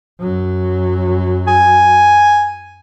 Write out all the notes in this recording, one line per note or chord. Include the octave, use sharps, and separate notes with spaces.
F#2 F#3
G#5